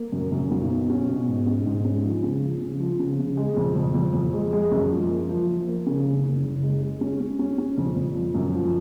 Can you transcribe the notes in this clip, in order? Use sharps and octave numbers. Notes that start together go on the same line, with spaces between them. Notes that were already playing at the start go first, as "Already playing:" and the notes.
Already playing: A#3
F#2
F#2
B1
B2
C#4
B2
G#2
C#4
G#2
C#4
F3
C#3
F3
C#3
F3
C#3
C#3
G#3
F2
F2
F2
F2
G#3
G#3
F#2
F3
A#3
F3
F3
A#3
C#3
F#1
F#1
F#1
G#3
G#3
C#4
C#4
C#4
C#4
F2
F2
F3
F#2
F3